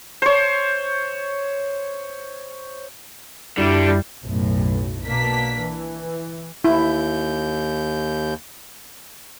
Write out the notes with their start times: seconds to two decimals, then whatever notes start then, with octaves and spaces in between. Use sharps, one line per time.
0.22 C5 C#5
3.58 F#2 D3 G3 E4
4.22 B1 F#2 A2
5.05 B2 A#3 D4 B6
5.59 E3
6.64 D#2 E4 G6